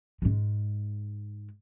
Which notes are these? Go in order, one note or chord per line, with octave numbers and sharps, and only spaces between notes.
G#2 G#3